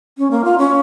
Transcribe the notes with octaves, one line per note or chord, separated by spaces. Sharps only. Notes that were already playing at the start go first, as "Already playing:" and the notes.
C#4
A#3
F4
C#4